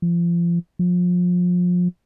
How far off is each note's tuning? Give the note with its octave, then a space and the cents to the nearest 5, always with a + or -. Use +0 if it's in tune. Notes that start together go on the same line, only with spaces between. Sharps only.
F3 -30
F3 +30